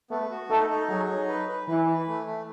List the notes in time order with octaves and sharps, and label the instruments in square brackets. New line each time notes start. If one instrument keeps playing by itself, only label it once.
[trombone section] A3 [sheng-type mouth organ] B3
[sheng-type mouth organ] F#4
[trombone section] A3 [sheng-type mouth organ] D#4
[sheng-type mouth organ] D#4
[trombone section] F#3 [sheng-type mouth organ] G#4
[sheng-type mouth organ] D#4
B4
B4
[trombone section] E3 [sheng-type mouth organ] B4
[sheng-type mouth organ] B4
A3
A3